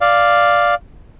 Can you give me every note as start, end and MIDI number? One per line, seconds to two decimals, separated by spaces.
0.01 0.75 74
0.01 0.75 77